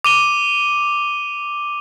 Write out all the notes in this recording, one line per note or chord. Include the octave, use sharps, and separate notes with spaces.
D6 D#7 G7